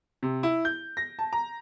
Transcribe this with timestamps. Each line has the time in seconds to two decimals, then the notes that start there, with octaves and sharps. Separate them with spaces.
0.23 C3
0.43 E4
0.65 G6
0.97 A#6
1.19 A5
1.33 A#5